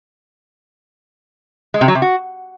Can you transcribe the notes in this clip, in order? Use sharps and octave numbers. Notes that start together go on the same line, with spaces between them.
G#3
C3
F#3
C3
F#4